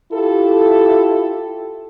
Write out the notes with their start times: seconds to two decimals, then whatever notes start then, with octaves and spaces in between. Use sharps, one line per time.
0.12 E4 F4 G4 A4